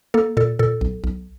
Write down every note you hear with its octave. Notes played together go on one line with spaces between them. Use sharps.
A#3 A4
A#2 A4
A#2 A4
B1
B1